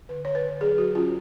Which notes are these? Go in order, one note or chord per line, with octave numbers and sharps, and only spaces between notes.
D3 B4
D3 C#5
B4
D3
F#3 G#4
F#3 F#4
C#4 F4